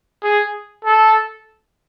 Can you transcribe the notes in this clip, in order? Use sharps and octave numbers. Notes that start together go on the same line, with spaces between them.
G#4
A4